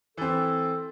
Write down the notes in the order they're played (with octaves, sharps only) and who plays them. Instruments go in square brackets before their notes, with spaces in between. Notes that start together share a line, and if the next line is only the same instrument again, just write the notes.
[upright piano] E3 C4 [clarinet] A4